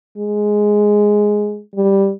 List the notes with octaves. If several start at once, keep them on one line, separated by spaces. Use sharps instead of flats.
G#3
G3